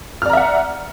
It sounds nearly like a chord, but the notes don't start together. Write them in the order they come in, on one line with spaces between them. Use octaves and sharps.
F6 D5 A#5 E5 F#5